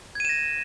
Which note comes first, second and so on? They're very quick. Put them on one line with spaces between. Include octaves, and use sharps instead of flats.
G#6 D#7 E7 A#6